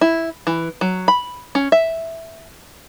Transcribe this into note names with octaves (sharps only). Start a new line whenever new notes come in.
E4
E3
F#3
B5
C#4
E5